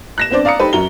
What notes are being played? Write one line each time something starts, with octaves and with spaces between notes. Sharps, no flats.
F#6 A#6 E7
B3 C4 D4 C5 D5
D5 F5 A#5 D#6 C#7
D#4 G4 A4 B4 C5
F#2 F#4 A#5 G7